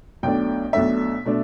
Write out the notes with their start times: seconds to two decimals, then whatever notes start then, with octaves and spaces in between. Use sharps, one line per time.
0.23 B1 B2 A3 D4 G5
0.73 B1 B2 A3 D4 E5
1.25 B2 A3 D4